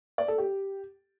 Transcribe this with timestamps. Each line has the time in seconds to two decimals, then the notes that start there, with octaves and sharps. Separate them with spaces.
0.18 D5
0.28 A4
0.38 G4